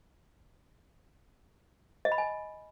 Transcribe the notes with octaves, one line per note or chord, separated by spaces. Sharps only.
D#5
B5
G#5